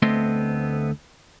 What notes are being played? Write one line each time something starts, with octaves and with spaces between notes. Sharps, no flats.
D2 A3 B3 C4 D#5 C6